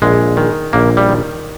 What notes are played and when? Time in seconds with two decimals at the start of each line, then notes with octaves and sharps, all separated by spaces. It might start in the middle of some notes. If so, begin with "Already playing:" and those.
0.02 A#1 G#3
0.37 D#3
0.73 A#1 A#3
0.97 G3
1.09 D#3